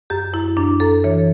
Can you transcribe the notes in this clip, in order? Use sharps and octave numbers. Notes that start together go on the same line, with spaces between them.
F#2 G4
F#2 E4
F#2 D4
F#2 A4
E3 C#5